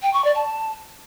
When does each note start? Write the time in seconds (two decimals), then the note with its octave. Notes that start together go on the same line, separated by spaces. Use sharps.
0.02 G5
0.13 C#6
0.24 D5
0.35 A5